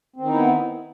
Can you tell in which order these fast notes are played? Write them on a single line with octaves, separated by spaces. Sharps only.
C4 D#3 D#4 E4 B3